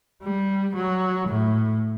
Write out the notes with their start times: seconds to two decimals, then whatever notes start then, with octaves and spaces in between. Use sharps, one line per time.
0.23 G3
0.76 F#3
1.28 A2